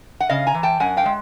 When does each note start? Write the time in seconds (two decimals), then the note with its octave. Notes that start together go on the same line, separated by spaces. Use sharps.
0.20 F#5
0.29 C#3 D#5 F5
0.47 G#5 A#5
0.54 E3
0.63 G5 A5
0.80 F#2 F#5 G#5
0.97 F5 G5
1.05 G#3